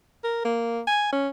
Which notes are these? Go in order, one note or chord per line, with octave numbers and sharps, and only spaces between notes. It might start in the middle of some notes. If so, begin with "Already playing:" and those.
A#4
A#3
G#5
C#4